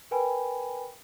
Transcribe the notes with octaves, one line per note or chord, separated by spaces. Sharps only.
A#4 B4 G5 G#5 B5